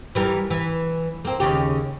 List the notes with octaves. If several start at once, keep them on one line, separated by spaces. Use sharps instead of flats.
E3 G3 A#4
E3
A#3 C4
D#2 C#3 G4